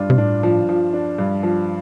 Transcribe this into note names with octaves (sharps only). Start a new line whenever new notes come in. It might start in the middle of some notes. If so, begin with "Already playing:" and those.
Already playing: G2 D4 F4
C3
A2 D4
F3
F3
D4
G2
F3